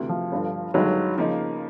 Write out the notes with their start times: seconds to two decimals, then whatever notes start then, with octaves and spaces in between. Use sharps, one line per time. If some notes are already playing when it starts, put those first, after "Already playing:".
Already playing: D2 C3 E3
0.09 F3
0.32 G1 G2 D3
0.74 G1 G2 D#3 F#3 G#3
1.17 C#3 F3 A#3 D#4